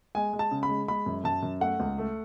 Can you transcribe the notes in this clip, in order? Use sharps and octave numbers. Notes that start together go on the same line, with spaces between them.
G#3 G#5
G#3
A5
C#3
B5
G#3
G#3 B5
F#2
F#2 A5
F#2
A3 F#5
C#2
A3